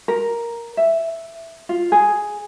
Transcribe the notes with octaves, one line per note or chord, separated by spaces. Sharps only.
A#4
E5
F4
G#4